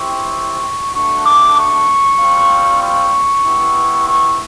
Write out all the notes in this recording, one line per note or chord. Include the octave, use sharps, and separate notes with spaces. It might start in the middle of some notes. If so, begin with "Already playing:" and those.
Already playing: C4 E4 G4 C#6
A3 D4 F#4 C#6
D6
C#6
G3 C4 F4
C#6
B3 E4 G4
C#6